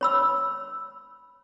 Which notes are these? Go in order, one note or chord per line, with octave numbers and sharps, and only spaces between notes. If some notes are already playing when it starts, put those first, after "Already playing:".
C#5 B5 E6